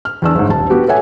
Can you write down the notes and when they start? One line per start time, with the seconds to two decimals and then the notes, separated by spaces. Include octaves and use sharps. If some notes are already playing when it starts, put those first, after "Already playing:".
0.05 F6
0.22 E2 D4 E6
0.35 G1 G#2
0.49 D#1 A5
0.70 B3 F#4 G4
0.88 A4 B4 C#5 E5 F#5 G#5